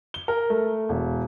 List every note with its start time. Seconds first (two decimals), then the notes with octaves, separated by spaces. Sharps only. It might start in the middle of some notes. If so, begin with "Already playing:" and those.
0.14 G7
0.28 A#4
0.50 A3
0.89 E1